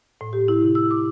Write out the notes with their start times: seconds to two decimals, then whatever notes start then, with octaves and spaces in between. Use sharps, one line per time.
0.21 A2
0.33 G4
0.48 E4
0.62 C3
0.75 E6
0.91 D6